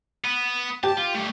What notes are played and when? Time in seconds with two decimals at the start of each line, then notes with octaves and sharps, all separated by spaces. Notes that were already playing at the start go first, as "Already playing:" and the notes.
0.25 B3
0.83 G4 A5
0.97 F4
1.15 G3 A3